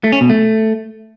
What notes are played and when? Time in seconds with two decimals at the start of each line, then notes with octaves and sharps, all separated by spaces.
0.04 A3
0.12 C#4
0.21 B2
0.30 A3